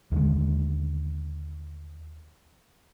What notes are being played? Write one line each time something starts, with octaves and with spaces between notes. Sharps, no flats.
D#2 D3 G#3